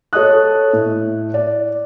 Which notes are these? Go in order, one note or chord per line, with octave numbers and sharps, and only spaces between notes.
A4 C#5 D#5 D#6 F#6
A2
D5